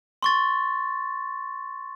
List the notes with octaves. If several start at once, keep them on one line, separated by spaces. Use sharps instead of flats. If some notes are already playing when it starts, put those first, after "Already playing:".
C6 C#6 A6